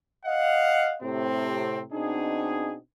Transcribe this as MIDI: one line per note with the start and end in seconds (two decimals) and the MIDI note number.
0.25 0.95 75
0.25 0.95 77
0.25 0.95 78
1.02 1.82 45
1.02 1.82 48
1.02 1.82 60
1.92 2.76 47
1.92 2.76 60
1.92 2.76 62
1.92 2.76 63
1.92 2.76 68